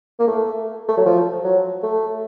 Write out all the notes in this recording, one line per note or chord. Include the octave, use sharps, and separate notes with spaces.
A#3
A3
A3
F#3
F3
F#3
A3